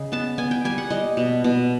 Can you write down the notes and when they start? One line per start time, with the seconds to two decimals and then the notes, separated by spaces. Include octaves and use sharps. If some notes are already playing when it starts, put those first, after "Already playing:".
Already playing: C#3 D#5
0.12 B3 A5
0.38 B3 G#5
0.51 G5
0.65 G3 G#5
0.78 F#5
0.90 G3 D#5
1.17 B2
1.44 B2